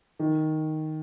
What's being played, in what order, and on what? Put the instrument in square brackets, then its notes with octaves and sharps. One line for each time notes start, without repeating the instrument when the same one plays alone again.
[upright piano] D#3